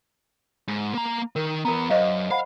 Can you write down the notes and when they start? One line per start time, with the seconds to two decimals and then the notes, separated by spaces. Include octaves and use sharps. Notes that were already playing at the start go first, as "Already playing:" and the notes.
0.68 G#2
0.94 A#3 A#5
1.36 D#3 A#4
1.65 E3 B3 A#4 A#5
1.90 F#2 C5 D#5 F5
2.30 C5 F5 F#5 B5